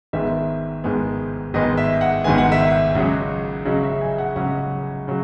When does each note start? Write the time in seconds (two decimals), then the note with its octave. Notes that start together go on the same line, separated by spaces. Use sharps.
0.13 G#1 G#2 D#3 G#3 B3 E5
0.84 G#1 G#2 D#3 G#3 B3
1.54 G#1 G#2 D#3 G#3 B3 D#5
1.77 E5
2.01 F#5
2.24 G#1 G#2 D#3 G#3 B3 G#5
2.38 F#5
2.52 E5
2.65 F#5
2.95 C#2 C#3 F#3 C#4
3.65 C#2 C#3 F#3 C#4 D#5
3.83 E5
4.01 G#5
4.18 F#5
4.36 C#2 C#3 F#3 C#4 F#5
5.08 C#3 F#3